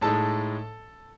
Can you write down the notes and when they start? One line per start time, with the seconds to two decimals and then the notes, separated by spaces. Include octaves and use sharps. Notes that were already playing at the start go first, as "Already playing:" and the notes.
0.01 A2 G#3 D#4 A4 A5